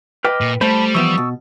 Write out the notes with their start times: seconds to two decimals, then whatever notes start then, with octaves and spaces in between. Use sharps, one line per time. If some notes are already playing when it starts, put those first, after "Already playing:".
0.25 B4 D#5 G5 D6 F6
0.41 A#2
0.61 G3 A3 C5 A5 B5
0.94 E3 F3 B3 C#6 D#6 E6
1.18 B2